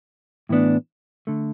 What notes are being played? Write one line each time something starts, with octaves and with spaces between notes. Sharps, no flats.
A2 E3 B3 D4
D3 A3